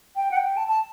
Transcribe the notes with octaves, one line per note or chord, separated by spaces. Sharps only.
G5
F#5
G5
A5
A5